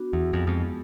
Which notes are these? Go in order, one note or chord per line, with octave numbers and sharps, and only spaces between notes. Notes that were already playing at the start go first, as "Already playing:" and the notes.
Already playing: B3 D4 F#4
E2
F2 G#3 B3 E4 G#4
F2